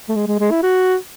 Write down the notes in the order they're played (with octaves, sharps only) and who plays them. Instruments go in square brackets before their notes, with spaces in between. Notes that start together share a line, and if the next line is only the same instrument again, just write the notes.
[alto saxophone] A3
G#3
G#3
G#3
E4
F#4